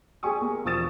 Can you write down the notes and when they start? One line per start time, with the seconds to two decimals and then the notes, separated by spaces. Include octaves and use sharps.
0.23 G4 G#4 G#5 C#6 D#6
0.42 A#3
0.65 E1 F3 C#6 D#6 A6 E7